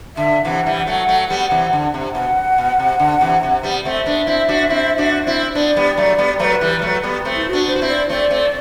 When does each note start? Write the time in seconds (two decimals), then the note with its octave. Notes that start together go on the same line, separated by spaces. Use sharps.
0.17 D3 E5
0.45 C3 E3 F#5
0.66 E3 G3
0.87 F#3 A3
1.08 F#3 A3
1.30 G3 B3
1.51 C3 E3
1.73 D3
1.94 C3
2.15 B2 F#5
2.58 B2
2.79 C3
2.99 D3
3.21 C3 E3
3.43 C3
3.63 G3 B3
3.85 A3 C4 E5
4.06 B3 D4
4.27 C4 E4
4.49 D4 F#4
4.69 C4 E4
4.98 D4 F#4
5.27 C4 E4
5.55 B3 D4 D5
5.76 G3 B3
5.97 F#3 A3
6.18 G3 B3
6.39 F#3 A3 B4 C5
6.61 E3 G3
6.79 G3
6.82 F#3 A3
7.03 G3 B3
7.25 A3 C4
7.35 E4
7.47 F#4
7.53 B3 D4
7.67 C5
7.76 F#4
7.82 C4 E4
7.89 D5
8.09 A3 C4 D5
8.30 A3 C4